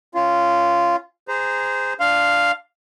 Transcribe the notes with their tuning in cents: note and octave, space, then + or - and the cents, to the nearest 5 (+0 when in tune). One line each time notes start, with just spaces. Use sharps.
C#4 +0 F4 -10
G#4 -20 C5 -20 A#5 +0
D4 +0 F5 +0 C6 -5